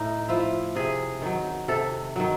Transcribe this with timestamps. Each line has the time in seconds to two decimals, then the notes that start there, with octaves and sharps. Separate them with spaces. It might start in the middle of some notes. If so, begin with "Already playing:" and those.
Already playing: A2 D#4
0.29 F3 E4
0.76 C3 G#4
1.22 D#3 F#3
1.68 C3 A4
2.16 D#3 F#3